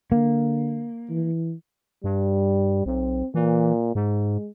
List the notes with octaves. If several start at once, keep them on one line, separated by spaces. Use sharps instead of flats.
D3 A#3
E3
G2 G3
B1 C4
A#2 E3
G#2 G#3